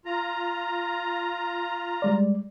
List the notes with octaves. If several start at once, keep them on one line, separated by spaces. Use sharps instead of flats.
F4 A#5
G3 G#3 D5